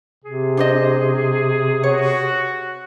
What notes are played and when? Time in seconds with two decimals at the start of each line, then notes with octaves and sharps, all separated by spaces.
0.24 C3 G#4
0.57 D4 C5 D#5
1.83 F#4 C#5